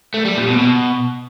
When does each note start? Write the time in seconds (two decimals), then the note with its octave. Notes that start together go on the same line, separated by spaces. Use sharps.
0.14 A3
0.25 G3
0.36 A#2
0.47 B2
0.59 B2